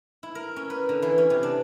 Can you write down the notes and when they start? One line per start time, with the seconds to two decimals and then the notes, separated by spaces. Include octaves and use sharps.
0.23 E4
0.35 A#4
0.56 C#4
0.70 B4
0.89 D3
1.02 E3
1.18 C#4
1.30 C3
1.43 D4